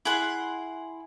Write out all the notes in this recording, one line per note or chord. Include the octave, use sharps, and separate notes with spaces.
E4 G#4 F#5 C6